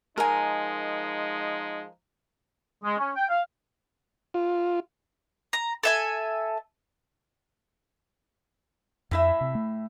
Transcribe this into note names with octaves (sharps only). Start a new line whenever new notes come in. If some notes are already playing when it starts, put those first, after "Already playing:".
F3 G#3 D#4 A#4 G#5
G#3
C#4
G5
F5
F4
A#5
A4 E5 G#5
F2 A2 E4 E5
C3
A3